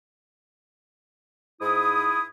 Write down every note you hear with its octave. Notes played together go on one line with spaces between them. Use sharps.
G#2 E4 D#6